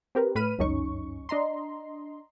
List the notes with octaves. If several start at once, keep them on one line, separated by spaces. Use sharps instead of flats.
C4 G4 A#4 B4
A2 B4 B5 F6 D#7
G1 C#2 F#2 C#4 D#4 C#6
D4 D#5 A#5 C6